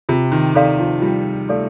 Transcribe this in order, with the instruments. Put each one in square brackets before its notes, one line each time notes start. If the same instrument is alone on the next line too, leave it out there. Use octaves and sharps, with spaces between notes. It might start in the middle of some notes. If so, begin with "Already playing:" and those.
[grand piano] C3 [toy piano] F4
[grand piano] D#3
[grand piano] D#3 [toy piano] A4 D5 F5 C6
[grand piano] F3
[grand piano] G3 [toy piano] F4
[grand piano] A3 [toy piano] A4 D5 F5 C6